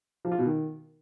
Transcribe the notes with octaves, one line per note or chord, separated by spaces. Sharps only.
F3
F4
B2
D#3